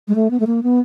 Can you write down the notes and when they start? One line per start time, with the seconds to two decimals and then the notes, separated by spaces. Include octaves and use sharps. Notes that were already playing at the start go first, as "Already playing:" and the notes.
0.08 G#3
0.15 A3
0.31 B3
0.40 A3
0.47 A#3
0.63 B3